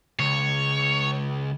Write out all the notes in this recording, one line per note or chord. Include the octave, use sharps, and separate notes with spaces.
C#2 C#5